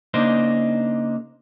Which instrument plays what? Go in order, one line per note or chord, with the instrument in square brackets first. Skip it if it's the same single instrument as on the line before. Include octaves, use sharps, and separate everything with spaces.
[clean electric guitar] C#3 A#3 D4 D#4 C5